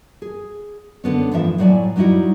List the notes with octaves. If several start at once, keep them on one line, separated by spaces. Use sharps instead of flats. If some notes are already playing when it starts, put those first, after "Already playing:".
G#4
D3 B3 C#4
E2 G#2 F3 E5
A2 F#3 D5 G#5
F#3 G3 D#4 E4 F#4